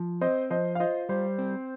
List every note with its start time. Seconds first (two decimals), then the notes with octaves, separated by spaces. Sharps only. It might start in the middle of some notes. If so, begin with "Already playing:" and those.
Already playing: F3
0.21 C4 C5 D#5
0.50 F3 C5 D#5
0.75 F5
0.80 F4 C5 D#5
1.09 G3 C5
1.38 C4